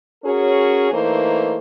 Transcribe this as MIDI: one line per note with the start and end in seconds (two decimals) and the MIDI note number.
0.23 0.90 61
0.23 0.90 66
0.23 0.90 68
0.23 0.90 70
0.23 0.90 73
0.91 1.58 52
0.91 1.58 57
0.91 1.58 58
0.91 1.58 63
0.91 1.58 72